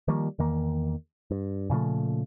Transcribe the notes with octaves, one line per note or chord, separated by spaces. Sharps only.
D#3 F3 G3 A#3
E2 D#3 A#3
G2
A#2 C#3 F3 A3